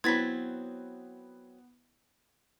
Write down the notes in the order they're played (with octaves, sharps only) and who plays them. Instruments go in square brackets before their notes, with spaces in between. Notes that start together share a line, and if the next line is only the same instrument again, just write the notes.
[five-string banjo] F#3 C4 [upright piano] B3 [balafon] E4 B5 [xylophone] G#6 A6 B6